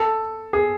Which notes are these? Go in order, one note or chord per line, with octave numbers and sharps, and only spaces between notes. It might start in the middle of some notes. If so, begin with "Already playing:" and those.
Already playing: A4
G#4